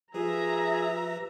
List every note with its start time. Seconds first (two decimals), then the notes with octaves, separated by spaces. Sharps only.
0.14 F3 F4 G4 G#4 B4 E5 A#5